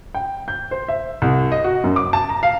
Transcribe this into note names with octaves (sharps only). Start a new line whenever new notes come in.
G5
G6
C5
E5
C2
D#5
F#4
F#2
D6
A5
A#5
F5